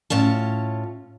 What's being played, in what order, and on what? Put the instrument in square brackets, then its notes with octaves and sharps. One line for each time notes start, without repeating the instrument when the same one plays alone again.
[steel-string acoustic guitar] A2 C#4 F4 A5